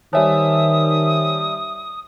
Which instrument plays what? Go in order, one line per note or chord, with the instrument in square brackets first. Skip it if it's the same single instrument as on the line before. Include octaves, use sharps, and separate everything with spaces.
[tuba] D#3 [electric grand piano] G3 E5 A5 [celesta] C5 C#5 G#5 [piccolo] D#6